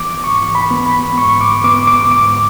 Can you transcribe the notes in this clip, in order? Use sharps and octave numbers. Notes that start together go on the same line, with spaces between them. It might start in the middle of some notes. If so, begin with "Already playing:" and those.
Already playing: E3 B3 D6
G#2 C#6
B5
B3
B5
G#2 C#6
D6
B3 D6
D6
G#2 D6